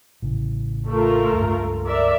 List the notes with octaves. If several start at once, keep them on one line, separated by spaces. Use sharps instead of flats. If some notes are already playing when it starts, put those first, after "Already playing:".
A1 C#3
A3 F4 A#4
C#2 G2
A#4 D5 E5